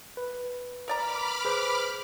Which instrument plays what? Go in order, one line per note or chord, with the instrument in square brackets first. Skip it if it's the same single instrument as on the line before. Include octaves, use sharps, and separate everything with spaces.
[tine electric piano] B4
[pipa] A#4 D5 A#5 [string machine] B5 D6 F6
[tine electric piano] G#4 B4 C5